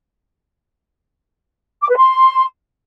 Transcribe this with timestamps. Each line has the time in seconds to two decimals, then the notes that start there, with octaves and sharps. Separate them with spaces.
1.81 D6
1.89 B4
1.97 C6